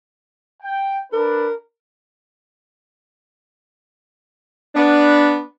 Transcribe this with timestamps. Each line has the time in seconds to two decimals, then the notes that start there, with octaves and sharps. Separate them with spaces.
0.62 G5
1.12 D4 A#4 B4
4.74 B3 D4